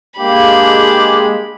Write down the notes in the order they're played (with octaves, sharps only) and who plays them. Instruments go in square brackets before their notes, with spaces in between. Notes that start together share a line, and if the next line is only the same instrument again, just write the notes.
[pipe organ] G#3 [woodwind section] A#3 [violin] D4 B5 [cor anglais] G4